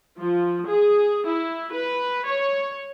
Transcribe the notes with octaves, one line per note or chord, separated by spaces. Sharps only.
F3
G#4
E4
B4
C#5